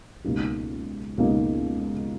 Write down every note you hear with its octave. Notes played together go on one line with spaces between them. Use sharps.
C#2 B2 A#3 D#4 G4
C#2 B2 A#3 D#4 G4